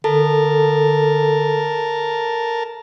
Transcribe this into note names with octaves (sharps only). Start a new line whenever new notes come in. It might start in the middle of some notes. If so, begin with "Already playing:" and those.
D3 A4 A#4 A5